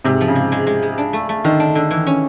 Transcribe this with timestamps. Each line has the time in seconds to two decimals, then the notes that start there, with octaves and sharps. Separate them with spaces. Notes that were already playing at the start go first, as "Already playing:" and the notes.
0.05 G#2 C3
0.21 F3
0.28 C#3
0.35 G#3
0.52 G#3
0.67 G#3
0.82 G#3
0.98 D4
1.13 A3
1.29 A3
1.44 D3 D#3
1.60 D4
1.75 D3
1.91 E3
2.07 C#4